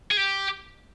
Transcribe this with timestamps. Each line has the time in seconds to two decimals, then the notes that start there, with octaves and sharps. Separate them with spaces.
0.11 G#4
0.17 G4